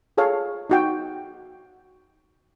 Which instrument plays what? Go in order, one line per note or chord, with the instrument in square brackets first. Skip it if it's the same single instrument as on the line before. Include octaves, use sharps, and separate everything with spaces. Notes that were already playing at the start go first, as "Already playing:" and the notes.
[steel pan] F4 G#4 A4 C#5 F5
D#4 F#4 G5